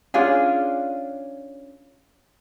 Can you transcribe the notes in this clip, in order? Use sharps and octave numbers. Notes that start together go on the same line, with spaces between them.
C#4 D4 F4 G#4